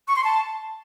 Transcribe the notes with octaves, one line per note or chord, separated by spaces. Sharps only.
C#6
C6
A5